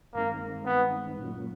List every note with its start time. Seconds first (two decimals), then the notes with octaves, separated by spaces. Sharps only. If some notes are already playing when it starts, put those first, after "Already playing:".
0.14 G2 D#3 G#3 A#3 C4 D#4
0.66 B3
1.17 A#2 F#3 A#3 C#4 F4